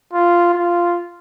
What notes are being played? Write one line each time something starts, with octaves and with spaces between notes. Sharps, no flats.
F4
F4